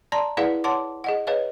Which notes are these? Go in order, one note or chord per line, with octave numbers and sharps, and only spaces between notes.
D5 A5 A#5 C6
E4 G#4 B4 D5 F5 F#5
C#5 F#5 A5 C6 D6
G#4 D#5 F#5
G#4 B4 C#5 D#5 F5